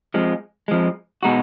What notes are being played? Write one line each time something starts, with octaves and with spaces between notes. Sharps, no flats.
F2 F3 G#3
F2 F3 G#3
B2 G#3 D#4 F#4